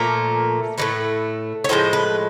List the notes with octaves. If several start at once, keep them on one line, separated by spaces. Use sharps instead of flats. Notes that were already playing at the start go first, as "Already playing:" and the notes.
Already playing: A#2 F3 A3 A#4
A2 F#3 A3 B4
C#5
A2 F3 G#3 C5
B4